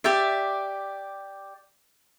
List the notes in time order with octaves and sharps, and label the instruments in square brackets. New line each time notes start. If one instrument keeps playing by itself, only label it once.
[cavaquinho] G4 D5 E5